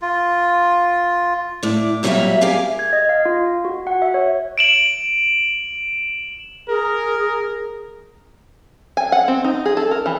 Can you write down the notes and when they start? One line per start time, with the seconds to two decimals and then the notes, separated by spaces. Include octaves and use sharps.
0.02 F4
1.63 A2 D5
2.03 F2 A#2 F#3 G3 E5 F5
2.41 G4 G#4 A#4 F5 G#5
2.79 G#6
2.93 D#5
3.09 F5
3.25 F4
3.65 F#4
3.87 F#5
4.02 E5
4.14 C#5
4.58 D7 E7 F#7
6.69 G#4 A#4
8.97 G#5
9.12 F#5
9.28 C4
9.44 D#4
9.65 G#4
9.77 A4
9.91 A#4
10.06 E3